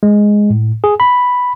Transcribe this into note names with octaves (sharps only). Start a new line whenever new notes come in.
G#3
A2
G#4
B5